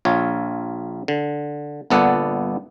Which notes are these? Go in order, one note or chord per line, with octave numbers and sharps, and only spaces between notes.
A#1 F4 C#5
D3
G1 A#2 B3 A4 D5 F#5